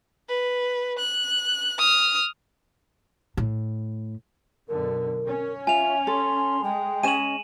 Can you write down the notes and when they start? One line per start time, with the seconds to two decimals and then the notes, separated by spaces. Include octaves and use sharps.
0.28 B4
0.99 F#6
1.79 D#6 F6
3.37 A2
4.68 F#2 B2 D3 A#4
5.26 C#4
5.67 F4 E5 G#5 F7
6.07 A4 C6
6.63 G#3 G5
7.03 C#4 D#5 G#5 D#7 E7 F#7